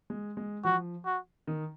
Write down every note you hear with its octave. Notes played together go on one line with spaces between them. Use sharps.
G#3
G#3
F3 F#4
F#4
D#3